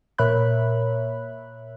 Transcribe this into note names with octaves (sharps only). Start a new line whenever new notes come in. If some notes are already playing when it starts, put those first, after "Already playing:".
A#2 A#4 C#5 E5 B5 F#6